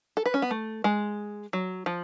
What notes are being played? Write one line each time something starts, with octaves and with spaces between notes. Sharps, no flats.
A4
B4
C#4
B3
A3
G#3
F#3
F3